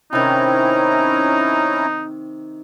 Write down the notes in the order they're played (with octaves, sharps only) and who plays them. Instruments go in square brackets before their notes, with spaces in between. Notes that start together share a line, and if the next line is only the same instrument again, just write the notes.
[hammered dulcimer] C3 D#3 [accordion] C#4 E4 A#5 [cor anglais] D#4